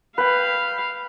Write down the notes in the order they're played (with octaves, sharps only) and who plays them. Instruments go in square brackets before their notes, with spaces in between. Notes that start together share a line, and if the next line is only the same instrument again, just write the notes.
[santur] B4 G5 [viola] F5